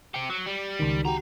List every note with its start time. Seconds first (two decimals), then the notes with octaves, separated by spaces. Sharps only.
0.14 C4 G4 C#7
0.30 F#3
0.46 G3
0.79 C#2 D#3
1.05 D4 F#4 G4 A#5